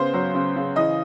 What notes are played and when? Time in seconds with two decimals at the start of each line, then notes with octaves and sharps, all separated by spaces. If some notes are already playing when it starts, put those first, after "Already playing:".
Already playing: C#3 B3 C5
0.14 F#3
0.35 C#3
0.56 C#3
0.76 E3 D#5